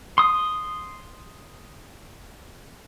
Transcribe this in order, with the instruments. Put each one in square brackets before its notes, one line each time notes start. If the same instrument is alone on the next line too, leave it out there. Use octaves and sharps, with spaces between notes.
[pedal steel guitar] C6 D#6